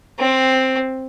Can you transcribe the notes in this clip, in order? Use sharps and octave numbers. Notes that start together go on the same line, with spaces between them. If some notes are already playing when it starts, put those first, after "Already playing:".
C4